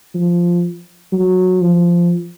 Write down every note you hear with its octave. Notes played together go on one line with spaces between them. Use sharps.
F3
F#3
F3